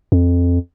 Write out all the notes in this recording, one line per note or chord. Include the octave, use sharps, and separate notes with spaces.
F2